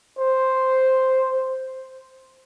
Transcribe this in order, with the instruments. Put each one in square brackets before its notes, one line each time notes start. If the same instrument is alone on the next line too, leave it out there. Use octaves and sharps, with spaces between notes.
[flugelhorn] C5